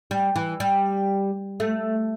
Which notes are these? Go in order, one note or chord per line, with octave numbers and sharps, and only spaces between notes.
G3
E3
G3
A3